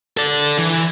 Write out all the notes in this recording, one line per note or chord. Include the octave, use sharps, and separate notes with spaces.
A4 D5
E3